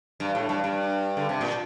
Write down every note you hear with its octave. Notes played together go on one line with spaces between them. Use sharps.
G2
A2
G2
G2
D3
C3
A#2